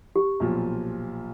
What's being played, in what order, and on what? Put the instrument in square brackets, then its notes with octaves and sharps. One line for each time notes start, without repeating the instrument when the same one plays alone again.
[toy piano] G4
[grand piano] B1 A#2 F3